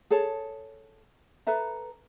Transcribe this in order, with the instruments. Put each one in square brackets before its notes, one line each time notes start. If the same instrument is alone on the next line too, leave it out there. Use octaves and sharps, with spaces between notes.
[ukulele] G#4 A4 C#5 A5
A4 B4 E5 A#5